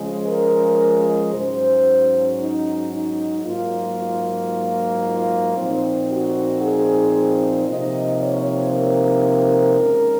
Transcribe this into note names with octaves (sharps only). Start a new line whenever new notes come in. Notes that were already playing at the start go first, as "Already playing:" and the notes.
Already playing: C#3 F3 G#3
A#4
G#2 F#3 C#4 C5
D#4
D#4
G#2 F#3 A#3 F4
F4
F4
A#2 F3 C4 D#4
F#4
G#4
C3 F3 A#3 D#4 D#5
C#5
A#4
D#2 C#3 G#3 C#4